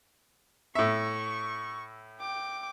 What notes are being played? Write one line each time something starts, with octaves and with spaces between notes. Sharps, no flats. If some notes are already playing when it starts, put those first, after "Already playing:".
A2 E5 C#6
G5 D6